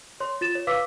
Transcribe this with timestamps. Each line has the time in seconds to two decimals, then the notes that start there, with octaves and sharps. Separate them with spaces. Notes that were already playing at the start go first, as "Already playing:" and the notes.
0.20 C#5 C6
0.41 F4 A6 E7
0.55 C#5
0.67 B4 F5 D6 E6 B6